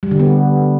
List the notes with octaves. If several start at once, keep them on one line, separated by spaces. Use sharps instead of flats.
G3
D3
B3